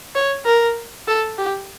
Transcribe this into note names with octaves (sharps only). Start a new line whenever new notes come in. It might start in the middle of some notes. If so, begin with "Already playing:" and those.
C#5
A#4
A4
G4